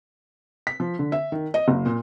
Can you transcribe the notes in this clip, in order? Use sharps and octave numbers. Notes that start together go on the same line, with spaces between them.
B6
F3
D3
E5
D#3
D#5
F#1
A#2